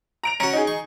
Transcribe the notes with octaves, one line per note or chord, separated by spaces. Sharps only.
A#5 D7 F7
C#4 F#4 A#5
D#4 G#4
C#6